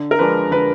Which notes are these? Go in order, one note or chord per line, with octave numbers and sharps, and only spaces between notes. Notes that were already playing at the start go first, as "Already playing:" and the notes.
Already playing: D3
A#4
F3 G#3 D4 B4
D3 B4